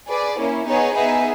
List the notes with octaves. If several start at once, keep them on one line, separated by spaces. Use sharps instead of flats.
G#4 B4 D5
A#3 C#4 E4
B3 D#4 G#4 C#5
B3 D#4 G#4 B4 E5